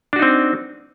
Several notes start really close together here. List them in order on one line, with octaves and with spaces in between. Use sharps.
D4 F#4 D#4 C4